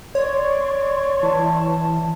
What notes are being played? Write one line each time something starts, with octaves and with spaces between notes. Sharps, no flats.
C#5 D5 C6 C#6
E3 A5